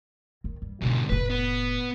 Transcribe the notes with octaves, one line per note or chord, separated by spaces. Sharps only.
D#3
G2
G#2 B2 D3 F4
F1 A2 B4
B3